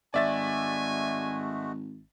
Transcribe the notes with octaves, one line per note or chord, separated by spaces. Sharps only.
G#1 G#3 A3 F#4 D5 E5 G#5 A6